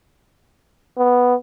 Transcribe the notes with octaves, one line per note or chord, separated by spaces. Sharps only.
B3